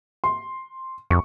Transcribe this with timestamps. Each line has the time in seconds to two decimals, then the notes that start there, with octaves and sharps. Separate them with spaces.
0.24 C6
1.10 F2 C#6